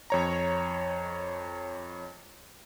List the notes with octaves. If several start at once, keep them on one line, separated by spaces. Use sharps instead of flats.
F2 C#5 A#5